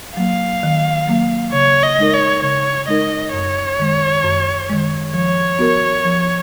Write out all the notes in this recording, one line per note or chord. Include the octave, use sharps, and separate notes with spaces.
F#3 A#3 F5
D#3
F#3 A#3
C#3 C#5
D#5
G#3 D#4 A#4
C#5
C#3 C#5
G#3 D#4 A#4 D#5
F#2 C#5
D#3 G#3
F#2
D#3 G#3
F3 C#5
B3 F#4 A#4
F3